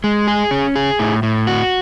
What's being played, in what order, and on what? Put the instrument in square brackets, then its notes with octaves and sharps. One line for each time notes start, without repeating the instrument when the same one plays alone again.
[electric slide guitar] G#3
G#4
C#4
G#4
A2
A2
F#4